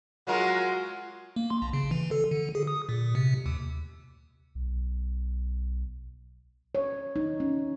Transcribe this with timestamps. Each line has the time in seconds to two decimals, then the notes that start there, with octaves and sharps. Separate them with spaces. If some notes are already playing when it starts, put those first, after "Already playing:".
0.27 F#3 G#3 F4 F#4 A#4
1.36 A#3
1.50 C6
1.62 A#1
1.73 C#3
1.91 E3
2.11 A4
2.31 D3
2.55 G#4
2.67 D#6
2.89 A#2
3.15 C3
3.46 D#2
4.55 B1
6.75 C#5
7.16 D#4
7.40 C#4